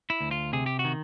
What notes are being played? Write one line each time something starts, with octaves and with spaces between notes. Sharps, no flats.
E4
D2
F4
C3 G#4
G4
F#4
D#3